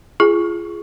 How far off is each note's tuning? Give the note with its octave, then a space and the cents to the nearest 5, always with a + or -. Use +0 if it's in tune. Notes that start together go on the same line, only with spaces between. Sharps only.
F4 -30 G#4 +0